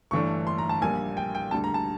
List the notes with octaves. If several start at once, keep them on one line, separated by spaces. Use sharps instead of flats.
G1 G2 E3 A3 D4 C#6
C6
A#5
A5
A#1 A#2 G3 A#3 G#5
G5
G5
D2 D3 G3 A5
A#5
A5